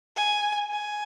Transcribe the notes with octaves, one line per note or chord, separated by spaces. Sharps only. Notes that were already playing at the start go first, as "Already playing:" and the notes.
G#5
G#5